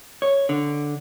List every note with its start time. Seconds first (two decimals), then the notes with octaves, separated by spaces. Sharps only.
0.22 C#5
0.49 D3